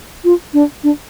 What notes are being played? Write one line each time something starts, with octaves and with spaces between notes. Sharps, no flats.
F4
D4
D4